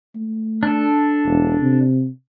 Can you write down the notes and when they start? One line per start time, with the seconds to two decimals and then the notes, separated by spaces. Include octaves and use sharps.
0.15 A3
0.63 D4 A4
1.25 E1
1.61 C3